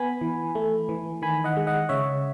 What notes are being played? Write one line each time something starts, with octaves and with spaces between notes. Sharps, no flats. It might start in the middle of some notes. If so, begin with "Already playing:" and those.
Already playing: B3 G#5 B5
E3
A3
E3
D#3 G#5 B5
D#5 F#5
G#3
D#5 F#5
C#3 C#5 E5